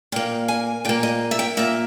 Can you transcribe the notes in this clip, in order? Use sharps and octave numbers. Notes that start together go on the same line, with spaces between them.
A#2 A#3 G5
G#5
A#2 A#3 G5
D#5
E5
G5
A#2 A#3 E5